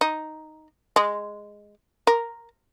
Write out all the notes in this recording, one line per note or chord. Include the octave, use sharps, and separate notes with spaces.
D#4
G#3
A#4